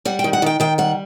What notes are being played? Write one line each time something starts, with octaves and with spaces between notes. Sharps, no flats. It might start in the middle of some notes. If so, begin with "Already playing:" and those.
G3 F#5
G5
D#3
F#5
D#3 G5
D#3 G5
G3 F#5